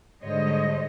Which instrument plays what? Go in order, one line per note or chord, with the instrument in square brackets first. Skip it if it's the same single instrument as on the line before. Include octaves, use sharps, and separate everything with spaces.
[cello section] G#2 D3 G3 C5 C#5 D#5